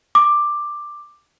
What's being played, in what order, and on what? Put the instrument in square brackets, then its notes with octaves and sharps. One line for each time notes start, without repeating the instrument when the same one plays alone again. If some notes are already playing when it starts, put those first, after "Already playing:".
[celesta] D6